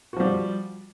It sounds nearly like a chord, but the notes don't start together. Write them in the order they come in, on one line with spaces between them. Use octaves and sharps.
F#4 F3 G3